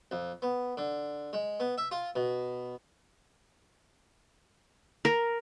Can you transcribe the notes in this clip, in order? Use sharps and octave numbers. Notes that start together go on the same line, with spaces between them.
F2
B3
D3
G#3
B3
E5
F4
B2
A#4